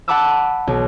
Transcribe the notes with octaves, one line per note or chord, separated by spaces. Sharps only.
F#5 A5 B5 D6 E6
B1